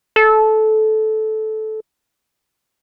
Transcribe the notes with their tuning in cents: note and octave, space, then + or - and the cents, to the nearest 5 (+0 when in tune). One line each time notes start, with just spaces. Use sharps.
A4 -15